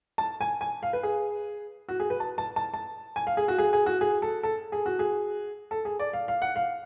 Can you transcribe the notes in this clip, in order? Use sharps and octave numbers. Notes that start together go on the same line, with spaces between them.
A5
G#5
G#5
F5
B4
G#4
F#4
G#4
B4
A5
A5
A5
A5
G#5
F5
G#4
F#4
G#4
G#4
F#4
G#4
A4
A4
G#4
F#4
G#4
A4
G#4
D5
F5
F5
F#5
F5